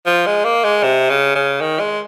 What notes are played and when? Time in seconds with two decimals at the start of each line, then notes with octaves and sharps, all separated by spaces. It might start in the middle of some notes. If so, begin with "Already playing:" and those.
0.06 F3
0.26 G#3
0.45 A#3
0.64 G#3
0.83 C3
1.10 C#3
1.35 C#3
1.61 D#3
1.80 G#3